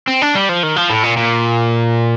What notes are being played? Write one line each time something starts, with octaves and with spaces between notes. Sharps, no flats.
C4
D4
G3
F3
D#3
F3
A2
A#2
A#2